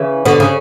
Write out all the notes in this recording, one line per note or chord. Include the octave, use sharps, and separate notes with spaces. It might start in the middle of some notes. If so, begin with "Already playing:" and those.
Already playing: C#3 E3
B2 D3
C#3